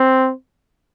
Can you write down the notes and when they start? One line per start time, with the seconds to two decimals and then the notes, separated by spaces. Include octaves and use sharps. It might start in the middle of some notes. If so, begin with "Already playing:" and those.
Already playing: C4